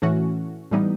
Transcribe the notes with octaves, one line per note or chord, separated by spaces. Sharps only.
A2 E3 A3 C#4 F#4
A2 E3 G3 B3 D#4